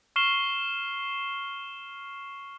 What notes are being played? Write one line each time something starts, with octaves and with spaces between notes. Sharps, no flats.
C#6 F6 C7 E7 G7